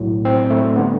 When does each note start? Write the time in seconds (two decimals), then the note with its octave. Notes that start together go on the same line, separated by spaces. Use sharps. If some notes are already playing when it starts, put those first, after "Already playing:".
Already playing: B1 A2 F#3
0.25 C4
0.50 A3
0.76 D3 G3 B3